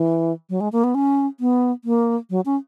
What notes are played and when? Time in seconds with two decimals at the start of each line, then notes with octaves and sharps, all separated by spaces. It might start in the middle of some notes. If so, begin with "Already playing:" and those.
Already playing: E3
0.50 F#3
0.60 G#3
0.72 A#3
0.84 B3
0.95 C#4
1.40 B3
1.85 A#3
2.30 F#3
2.46 C#4